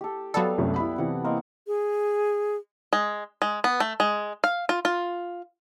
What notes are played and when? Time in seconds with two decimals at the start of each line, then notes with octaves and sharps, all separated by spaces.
0.01 G4 A4
0.34 F#3 G3 B3 A4 F5
0.58 C2 F#2 A3
0.76 B3 E4 B5
0.98 C3 E3 F#5
1.24 A#3 C4 D#5
1.67 G#4
2.93 G#3
3.42 G#3
3.64 B3
3.80 A3
4.00 G#3
4.44 F5
4.69 F4
4.85 F4